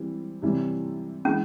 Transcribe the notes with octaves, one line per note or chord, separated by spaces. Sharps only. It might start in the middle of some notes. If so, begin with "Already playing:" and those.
Already playing: E3 G3 C4
C3 E3 G3 C#4 E4
E3 G#3 C#4